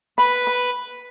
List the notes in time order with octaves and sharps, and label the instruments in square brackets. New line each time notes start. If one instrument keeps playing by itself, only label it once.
[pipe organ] B4 [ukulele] B5
[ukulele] B5